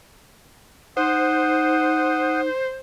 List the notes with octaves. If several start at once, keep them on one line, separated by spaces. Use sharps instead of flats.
D#4 C5 F#5 D#6